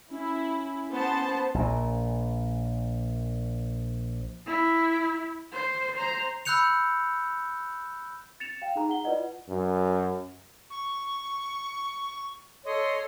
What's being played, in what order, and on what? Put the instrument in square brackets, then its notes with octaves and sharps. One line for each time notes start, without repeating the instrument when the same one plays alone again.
[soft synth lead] C#4 [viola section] E4
[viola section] B3 C5 A5
[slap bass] A#1 A#2
[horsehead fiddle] E4
C5
C5 A#5
[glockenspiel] B5 E6 F#6 G6 C#7 F7
[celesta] A6 C#7 E7 F7
F5 G5
D#4 G#4 A#5
F#5 G7
E4 F4 B4 D5 D#5 F#5
[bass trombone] F#2
[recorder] C#6
[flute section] A4 C#5 C6 [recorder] D#5